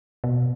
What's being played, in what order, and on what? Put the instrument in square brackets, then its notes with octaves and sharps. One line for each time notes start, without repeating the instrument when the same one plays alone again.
[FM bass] B2